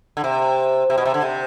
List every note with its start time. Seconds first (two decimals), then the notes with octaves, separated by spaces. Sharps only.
0.17 D3
0.24 C3
0.90 C3
0.98 B2
1.05 C3
1.14 D3
1.22 C3